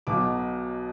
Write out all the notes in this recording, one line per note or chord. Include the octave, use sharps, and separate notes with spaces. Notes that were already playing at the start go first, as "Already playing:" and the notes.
B1 B2 F#3 D6